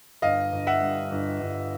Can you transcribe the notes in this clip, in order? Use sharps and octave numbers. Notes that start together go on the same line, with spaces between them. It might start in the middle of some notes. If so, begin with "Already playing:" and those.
G1 D#5 F5
G1
E5 F#5
G2
G1
G1